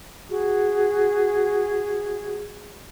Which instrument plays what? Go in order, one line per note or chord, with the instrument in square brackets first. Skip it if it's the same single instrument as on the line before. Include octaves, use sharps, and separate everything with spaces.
[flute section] F#4 G#4